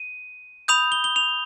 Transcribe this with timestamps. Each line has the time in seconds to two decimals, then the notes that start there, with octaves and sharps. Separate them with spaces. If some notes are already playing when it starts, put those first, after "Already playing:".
Already playing: D#7
0.68 B5 D#6 G6 F7
0.92 G7
1.04 G7
1.16 F7